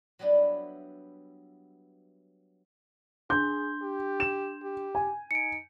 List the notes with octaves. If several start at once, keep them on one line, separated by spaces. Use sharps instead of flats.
F#3 G3 B3 D4 E4
D4 G#4 C6 G6
G4
E7
G4
G#5
D#4 C#7 D7